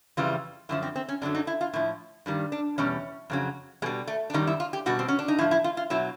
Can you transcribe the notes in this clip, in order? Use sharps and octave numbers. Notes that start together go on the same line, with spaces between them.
F2 C#3 E3 G3 F4
F#2 D3 F3 E4
C4
C4
C#4
F#2 D3 F#3 D4
D#4
E4
F4
A2 F3 E4
G2 D#3 G3
D4
E2 B2 G3 C#4
F2 C#3 F#3
B2 G3 G#3
A3
D4
F#2 D#3 G3 D#4
E4
F4
G4
B2 G3 F#4
C4
C#4
D4
D#4
A2 F3 E4
E4
F4
F4
B2 F#3 E4